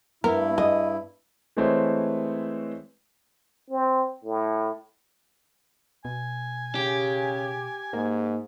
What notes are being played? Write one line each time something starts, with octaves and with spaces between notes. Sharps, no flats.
G2 B3 E4 A#4
G#3 D#5
E3 G#3 A3 C4 C5 C#5
C4
A2
B2 G#5
C#3 G4
G#2 A#3